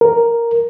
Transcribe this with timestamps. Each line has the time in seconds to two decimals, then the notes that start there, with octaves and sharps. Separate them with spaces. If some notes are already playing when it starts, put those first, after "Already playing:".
0.01 A#4